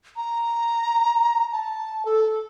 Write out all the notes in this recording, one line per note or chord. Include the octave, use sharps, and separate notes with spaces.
A#5
A5
A4